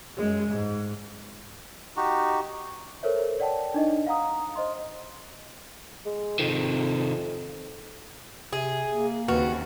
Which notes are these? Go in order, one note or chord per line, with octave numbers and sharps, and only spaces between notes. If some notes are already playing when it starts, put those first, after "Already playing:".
F#2 G#3
G#2
D#4 F#4 G4
A4 A#4 C5 C#5 E5
C#5 D5 F#5 G5 A5
D4 D#4 D#5
F5 F#5 A#5 D#6
C5 D#5 C6
G#3
F2 C3 D#3
C3 G#4
A#3
D#2 C#3 C4 F#4 B4